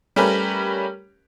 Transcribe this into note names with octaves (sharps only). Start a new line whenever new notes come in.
G3 A3 C#4 G4 A#4 B4